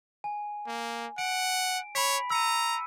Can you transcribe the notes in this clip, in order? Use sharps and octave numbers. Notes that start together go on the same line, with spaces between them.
G#5
A#3
F#5 D7
C#5 B5 B6
A#5 E6 C#7 D#7